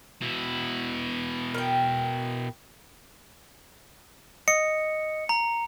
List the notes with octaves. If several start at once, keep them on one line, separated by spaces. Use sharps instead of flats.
B2 E4
A#4 G5
D#5 C#7
A#5